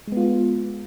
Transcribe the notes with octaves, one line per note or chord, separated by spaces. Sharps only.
G#3 B3 F4